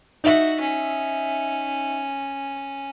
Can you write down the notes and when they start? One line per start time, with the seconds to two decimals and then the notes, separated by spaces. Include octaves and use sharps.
0.24 D#4 F#4 E5
0.60 C#4